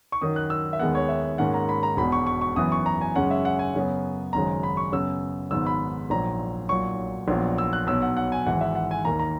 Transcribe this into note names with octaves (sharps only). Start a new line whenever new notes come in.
C#6
F#2 D#3 F#3 D#6
F#6
E6
E5
D#2 D#3 G#3 B3 F#5
C#5
E5
G#2 D#3 A#3 C#4 F#5
A#5
B5
A#5
E1 E2 B2 B5
C#6
C#6
C#6
F#2 E3 B3 D#6
C#6
A#5
G#5
F#2 C#3 G#3 C#4 F#5
E5
F#5
G#5
F#2 C#3 F#3 B3
G#1 F#2 C#3 G#3 A#5
B5
C#6
F#2 C#3 F#3 B3 E6
G#1 G#2 F#3 B3 E6
B5
A#1 A#2 F#3 A#5
B1 A#2 F#3 C#6
A#1 A#2 F#3 B3
E6
F#6
B1 B2 F#3 B3 E6
F#5
F#5
G#5
G#1 G#2 E3 F#5
E5
F#5
G#5
D#2 D#3 A#3 A#5
A#5